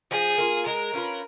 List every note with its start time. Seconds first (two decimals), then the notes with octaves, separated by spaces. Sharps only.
0.11 F3 G#4
0.38 A#3 F4
0.66 G#3 A#4
0.94 C#4 F4 B4